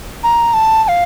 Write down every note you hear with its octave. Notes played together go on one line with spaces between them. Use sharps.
A#5
A5
A5
F5